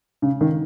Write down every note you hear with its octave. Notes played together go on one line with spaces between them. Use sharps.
C#3
D#3